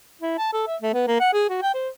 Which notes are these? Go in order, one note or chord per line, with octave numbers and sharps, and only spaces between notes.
E4
A5
A4
E5
A3
B3
A#3
F#5
G#4
F#4
G5
C5